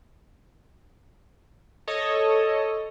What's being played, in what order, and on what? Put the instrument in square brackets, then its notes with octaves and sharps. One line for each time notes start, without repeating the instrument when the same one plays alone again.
[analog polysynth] A4 C#5 D#5